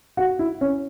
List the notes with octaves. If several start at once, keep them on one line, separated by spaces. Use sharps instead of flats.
F#4
E4
C#4